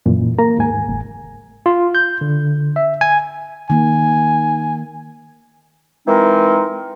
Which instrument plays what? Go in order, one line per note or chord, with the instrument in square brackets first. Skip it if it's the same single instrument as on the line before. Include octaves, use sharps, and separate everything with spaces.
[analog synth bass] F#2 [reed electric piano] A#2 E3
[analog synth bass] A#3 [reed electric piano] A#5
[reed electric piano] D#2 G#2 G#5
[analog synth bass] F#1
[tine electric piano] F4
G6
D3
E5
G#5
[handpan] D#3 A#3 [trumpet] G#5
[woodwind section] E3 G#3 C4 D#4 A#4